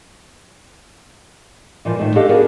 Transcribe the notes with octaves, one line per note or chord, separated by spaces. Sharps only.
A#2 E3 F3
A2 D#3 A3
D4 G4 A4 D#5 F5
B3 D4 E4 F#4 G#4 A#4